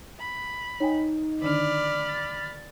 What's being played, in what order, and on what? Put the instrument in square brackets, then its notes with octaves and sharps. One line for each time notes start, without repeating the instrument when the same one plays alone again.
[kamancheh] B5
[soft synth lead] D#4 [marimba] C#5 G5 G#5
[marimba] D3 D#3 D4 [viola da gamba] D5 [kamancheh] B5 F6
[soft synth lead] A6